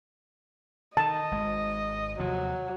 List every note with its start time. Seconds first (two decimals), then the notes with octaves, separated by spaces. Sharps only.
0.97 D#3 D#5 A5
1.31 G#1 G#2 G#3
2.19 D#2 C3 F3 F#3